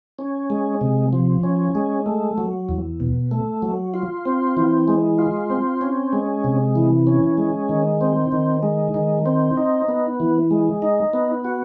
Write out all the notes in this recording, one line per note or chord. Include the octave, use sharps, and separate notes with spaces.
C#4
G#3
C3
F3
C#4
G#3
A3
F#3
E2
B2
A3
F#3
F4
C4
E3
G#3
F4
C4
C#4
G#3
C3
E3
C#4
G#3
D#3
C4
D#3
G#3
D#3
C4
D#4
B3
E3
G#3
D#4
B3
F#4